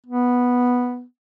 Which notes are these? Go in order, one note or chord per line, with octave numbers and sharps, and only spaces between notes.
B3